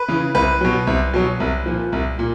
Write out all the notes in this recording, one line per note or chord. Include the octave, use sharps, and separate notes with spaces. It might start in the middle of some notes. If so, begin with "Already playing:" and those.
Already playing: B4
C#3 E3
C2 B4
B2 F#3
C2
B2 F#3
C2
A#2 F3
C2
A#2